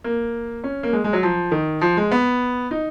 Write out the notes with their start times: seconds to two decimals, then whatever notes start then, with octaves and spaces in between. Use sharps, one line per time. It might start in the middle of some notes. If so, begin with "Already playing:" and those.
0.04 A#3
0.64 C#4
0.83 A#3
0.93 G#3
1.04 G#3
1.13 F#3
1.23 F3
1.52 D#3
1.81 F3
1.97 G#3
2.12 B3
2.71 D#4